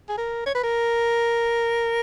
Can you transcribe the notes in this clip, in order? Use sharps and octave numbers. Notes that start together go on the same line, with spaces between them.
G#4
A#4
C#5
B4
A#4